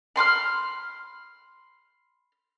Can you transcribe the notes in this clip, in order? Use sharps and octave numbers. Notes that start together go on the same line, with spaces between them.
B5 C6 D6 F6